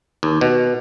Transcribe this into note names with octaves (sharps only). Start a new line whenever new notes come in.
D#2
B2